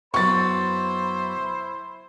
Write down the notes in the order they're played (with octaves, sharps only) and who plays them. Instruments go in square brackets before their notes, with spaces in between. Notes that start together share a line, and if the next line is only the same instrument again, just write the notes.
[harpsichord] F#2 F#3 B3 [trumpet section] E4 C5 B5 [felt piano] C#6 A6